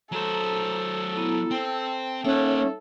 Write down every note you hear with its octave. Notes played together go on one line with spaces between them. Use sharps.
F#3 A4 C5 A#5
B3 E4 A#5
C4 G5 A5
A#3 C#4 D#4 A4 C#5 E5 F#5